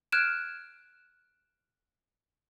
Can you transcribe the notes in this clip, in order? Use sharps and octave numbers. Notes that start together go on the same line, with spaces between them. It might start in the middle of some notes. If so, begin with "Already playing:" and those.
F6 F#6 G#6 D7 E7